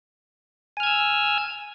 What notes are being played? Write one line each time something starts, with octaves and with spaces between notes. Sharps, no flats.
G#5 E6 F6 G#6